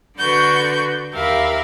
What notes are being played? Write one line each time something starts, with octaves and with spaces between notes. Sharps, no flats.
D3 F#4 B4 D5 C#6 G6
D#2 G4 A#4 E5 F5 B5